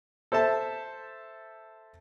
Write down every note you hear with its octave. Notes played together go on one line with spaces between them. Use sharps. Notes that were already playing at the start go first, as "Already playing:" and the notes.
A4 C5 E5 A5